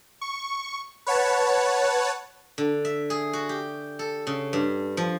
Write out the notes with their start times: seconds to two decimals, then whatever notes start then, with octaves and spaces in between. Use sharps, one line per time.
0.21 C#6
1.06 B4 C#5 F#5 A5
2.58 D3
2.85 E5
3.10 G#4
3.33 F#4
3.49 G4
3.99 A4
4.27 C#3
4.53 G2
4.97 F3